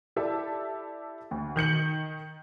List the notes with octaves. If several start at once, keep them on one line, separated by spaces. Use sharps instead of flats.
E4 G4 A4 D5 E5 A5
D2
D#3 G6 C#7 F#7